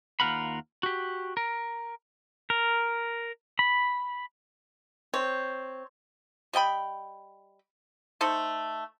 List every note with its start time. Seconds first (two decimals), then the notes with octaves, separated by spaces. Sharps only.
0.20 D#2 G#2 F4 A#4 F#5 B5
0.83 F#4 G4
1.37 A#4
2.50 A#4
3.59 B5
5.14 C4 C#5
6.53 G3 D#5 G5 B5
8.21 A3 D#4 A4 C5